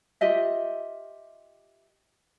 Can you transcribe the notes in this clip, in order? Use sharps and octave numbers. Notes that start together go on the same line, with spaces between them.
F4 G4 D#5 E5